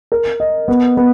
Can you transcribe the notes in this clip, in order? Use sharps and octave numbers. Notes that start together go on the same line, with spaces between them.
A#4
D#5
B3
B3